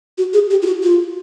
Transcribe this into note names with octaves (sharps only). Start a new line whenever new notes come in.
F#4
G#4
G4
F4
F#4
F4